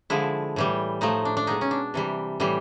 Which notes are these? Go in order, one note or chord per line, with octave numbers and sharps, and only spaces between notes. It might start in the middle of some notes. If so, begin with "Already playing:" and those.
D3 F3 G#3 E4
A2 E3 G3
A2 F3 A3 D#4
D4
D4
B2 G#3 D#4
C#4
D4
C3 E3 G3
A2 E3 G3